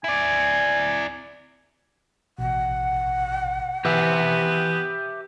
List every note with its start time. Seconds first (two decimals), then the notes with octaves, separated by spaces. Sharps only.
0.04 E4 D5 G#5
2.38 A1 B2 F#5
3.85 E3 B3 G4 B4 E5 G#5